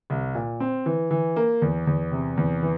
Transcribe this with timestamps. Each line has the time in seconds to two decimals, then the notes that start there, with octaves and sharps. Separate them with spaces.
0.10 C2
0.35 A#2
0.60 C4
0.86 E3
1.11 E3
1.36 A#3
1.62 E2
1.87 E2
2.11 C3
2.37 E2
2.63 E3